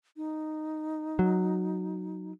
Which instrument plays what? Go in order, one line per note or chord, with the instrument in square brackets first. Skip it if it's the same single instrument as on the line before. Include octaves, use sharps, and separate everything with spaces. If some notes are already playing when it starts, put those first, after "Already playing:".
[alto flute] D#4
[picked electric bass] F#3